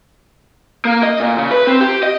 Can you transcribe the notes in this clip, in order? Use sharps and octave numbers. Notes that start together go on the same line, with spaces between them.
A#3
D#5
A#2
C#3
B4
C4
G4
D#5